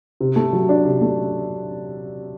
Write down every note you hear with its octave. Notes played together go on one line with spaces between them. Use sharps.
C3
A3
F#3
D4
C3
A3